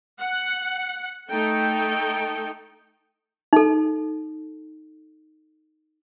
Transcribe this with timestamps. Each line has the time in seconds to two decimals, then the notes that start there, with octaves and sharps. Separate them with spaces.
0.19 F#5
1.29 A3 D#4 A4 G5
3.53 D#4 A4